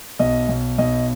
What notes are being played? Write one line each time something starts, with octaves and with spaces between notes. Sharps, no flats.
B1 D#5
B1
B1 D#5